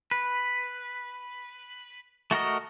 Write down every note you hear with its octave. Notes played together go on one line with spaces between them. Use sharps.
B4
A3 F#4 A#4 D#5